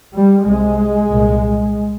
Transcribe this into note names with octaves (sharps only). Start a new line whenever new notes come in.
G3
C2 C3 G#3
C2 A#2